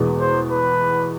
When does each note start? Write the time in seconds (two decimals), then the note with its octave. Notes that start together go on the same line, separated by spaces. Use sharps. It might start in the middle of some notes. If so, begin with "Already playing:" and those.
Already playing: E2 B2 G#3
0.20 C5
0.49 B4